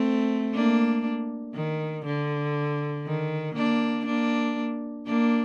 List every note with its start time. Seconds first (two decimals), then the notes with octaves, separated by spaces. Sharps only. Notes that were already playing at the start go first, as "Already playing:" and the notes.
Already playing: A3 C4
0.54 A#3 D4
1.54 D#3
2.06 D3
3.06 D#3
3.56 A#3 D4
4.06 A#3 D4
5.07 A#3 D4